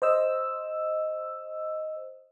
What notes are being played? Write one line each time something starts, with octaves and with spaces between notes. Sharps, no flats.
C5 D#5 E6